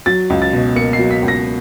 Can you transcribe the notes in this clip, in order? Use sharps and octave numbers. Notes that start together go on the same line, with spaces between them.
F#3 A6
C#2
A6
B2
A#3 C#7
C7
F#3
B6
C#2
A#6